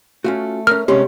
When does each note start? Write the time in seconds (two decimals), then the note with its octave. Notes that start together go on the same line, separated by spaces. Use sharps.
0.24 A3 C#4 F4 F#4
0.67 C#4 A#4 F6
0.88 C2 C3 G3 G#3 C#4 G4 C6